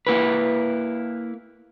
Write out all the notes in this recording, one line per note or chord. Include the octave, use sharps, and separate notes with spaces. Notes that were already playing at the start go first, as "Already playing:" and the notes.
A#3 E4 B4